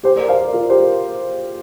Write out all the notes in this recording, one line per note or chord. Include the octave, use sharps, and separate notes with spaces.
G4 C5
A#4 D5
C5 F5
A#4 D5
F4 A#4
G4 C5
A#4